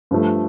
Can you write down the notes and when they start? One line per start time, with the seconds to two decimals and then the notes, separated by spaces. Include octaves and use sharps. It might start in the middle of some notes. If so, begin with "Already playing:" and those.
0.11 G2 F3 A3